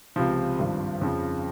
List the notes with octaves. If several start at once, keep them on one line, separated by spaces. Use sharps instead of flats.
C#2 C3 F3
G#1 G2 F3
F2 C#3 F3